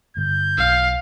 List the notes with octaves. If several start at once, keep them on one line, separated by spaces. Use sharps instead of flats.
G2 D3 G6
B1 F5